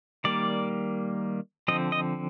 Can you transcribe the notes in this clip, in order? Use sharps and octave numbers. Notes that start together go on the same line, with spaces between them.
D#3 G3 A#3 D5
D3 F3 C4 D#5
D#5